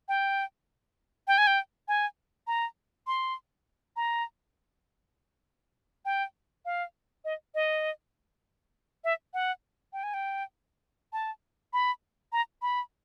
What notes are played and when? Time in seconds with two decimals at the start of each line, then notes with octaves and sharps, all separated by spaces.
0.09 G5
1.28 G5
1.38 G#5
1.47 G5
1.88 G#5
2.47 A#5
3.07 C6
3.96 A#5
6.05 G5
6.65 F5
7.25 D#5
7.55 D#5
9.04 E5
9.34 F#5
9.93 G5
10.03 G#5
10.14 G5
11.13 A5
11.73 B5
12.32 A#5
12.62 B5